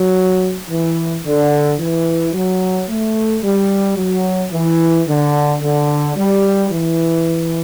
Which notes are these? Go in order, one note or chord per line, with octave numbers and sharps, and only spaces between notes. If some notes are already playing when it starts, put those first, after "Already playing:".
Already playing: F#3
E3
D3
E3
F#3
A3
G3
F#3
E3
D3
D3
G3
E3